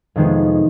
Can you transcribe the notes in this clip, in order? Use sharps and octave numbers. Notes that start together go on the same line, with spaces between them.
F2 C3 D#3 G#3 B3